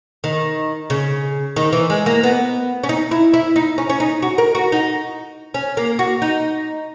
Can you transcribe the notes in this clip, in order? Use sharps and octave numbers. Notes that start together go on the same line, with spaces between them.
D#3
C#3
D#3
E3
G#3
A#3
B3
C#4
D#4
E4
E4
D#4
C#4
C#4
D#4
F#4
A#4
F#4
D#4
C#4
A#3
F#4
D#4